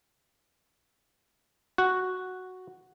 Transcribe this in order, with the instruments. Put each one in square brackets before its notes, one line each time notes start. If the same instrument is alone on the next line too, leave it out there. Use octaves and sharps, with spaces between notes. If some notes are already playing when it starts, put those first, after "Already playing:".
[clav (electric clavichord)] F#4